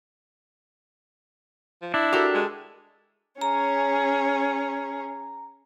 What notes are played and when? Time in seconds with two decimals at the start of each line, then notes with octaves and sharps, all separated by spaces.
1.82 F3
1.94 D4 E4
2.13 F#4 G4 A4 A#4
2.35 G#3
3.41 C#4 G#4 C#5 A#5